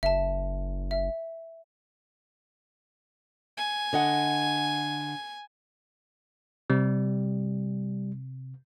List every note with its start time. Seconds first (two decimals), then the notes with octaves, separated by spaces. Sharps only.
0.03 F#1 E5 A5
0.91 E5
3.57 G#5
3.93 D3 D#5 F#5
6.70 C3 G3